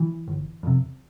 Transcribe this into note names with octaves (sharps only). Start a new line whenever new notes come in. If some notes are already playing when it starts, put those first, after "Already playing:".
Already playing: E3
G1
F2 C3